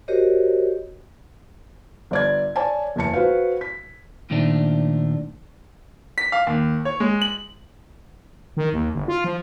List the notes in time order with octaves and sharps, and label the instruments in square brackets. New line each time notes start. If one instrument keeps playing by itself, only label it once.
[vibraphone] F#4 G4 A#4 C5 C#5 D#5
[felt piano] G1 D5 G#6
C#5 D5 G#5 A5
F#1 E2 A5 C#7
F#4 B4 C5 F5
B6
[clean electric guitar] A#2 D#3 F3 A3 D4
[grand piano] B6
F5
D#2
C#5
G#3
F#7
[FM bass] D#3
D#2
G1
F4
F3